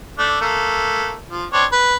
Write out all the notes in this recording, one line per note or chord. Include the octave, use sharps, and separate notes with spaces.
A3 D4
A3 A#3
F3
C4 D4 C#5
B4